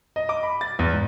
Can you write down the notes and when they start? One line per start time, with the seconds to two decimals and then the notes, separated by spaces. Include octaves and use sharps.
0.16 D#5
0.29 D6
0.43 B5
0.61 A6
0.79 E2
0.93 G#2